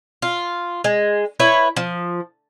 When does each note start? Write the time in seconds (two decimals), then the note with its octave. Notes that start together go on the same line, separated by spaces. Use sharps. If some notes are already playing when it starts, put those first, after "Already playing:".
0.22 F4
0.84 G#3
1.40 E4 B4 C#5
1.76 F3